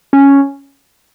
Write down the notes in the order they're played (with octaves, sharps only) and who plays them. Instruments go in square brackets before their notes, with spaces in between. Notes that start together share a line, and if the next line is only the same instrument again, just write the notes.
[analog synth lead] C#4